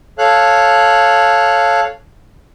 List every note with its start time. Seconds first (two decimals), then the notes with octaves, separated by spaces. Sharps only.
0.19 A4 C#5 F5 F#6